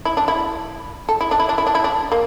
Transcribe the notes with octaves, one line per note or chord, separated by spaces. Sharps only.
E4
D4
E4
A4
E4
D4
E4
D4
E4
D4
E4
D4
A#3